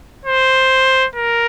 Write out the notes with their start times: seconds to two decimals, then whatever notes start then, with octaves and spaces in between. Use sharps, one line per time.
0.25 C5
1.15 A#4